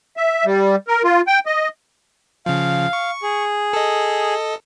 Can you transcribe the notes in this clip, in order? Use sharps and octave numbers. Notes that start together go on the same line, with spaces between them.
E5
G3
A#4
F4
G5
D#5
C#3 F3 F5
C#6
G#4
A4 D#5